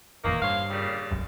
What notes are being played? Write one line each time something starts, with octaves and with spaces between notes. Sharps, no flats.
F#1 E2 A#2 D#3 A#3
G2 C5 C#5 F5
A#2 C#3 G3
E1 B1 F#2